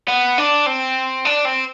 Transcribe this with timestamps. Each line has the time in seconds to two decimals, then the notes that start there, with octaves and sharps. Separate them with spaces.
0.08 B3
0.38 D4
0.66 C4
1.25 D4
1.45 C4